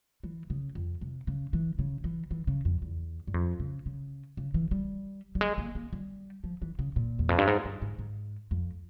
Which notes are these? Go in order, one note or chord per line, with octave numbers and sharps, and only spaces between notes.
E3
C#3
F2
C3
C#3
E3
C#3
E3
E3
C#3
F2
E2
G2
F2
C#3
C#3
C#3
E3
G3
G3
G#3
A#3
A#3
G3
F3
E3
C#3
A#2
E2
F2
G2
G#2
G2
G#2
G#2
F2